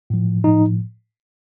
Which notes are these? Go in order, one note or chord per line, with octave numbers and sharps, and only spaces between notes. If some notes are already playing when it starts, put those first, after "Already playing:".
A2 F3
A2 F3 D#4